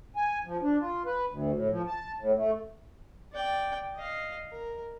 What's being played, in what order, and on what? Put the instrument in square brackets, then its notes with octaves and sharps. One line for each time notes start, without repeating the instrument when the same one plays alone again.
[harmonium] G#5
F3
D4
F4
B4
D2
A2
F3
A5
A2
A3
[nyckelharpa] D5 G5
D#5 F5
A#4